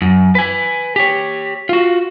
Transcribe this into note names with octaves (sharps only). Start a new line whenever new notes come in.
F#2
B4 G#5
G4 C#5
F4 F#4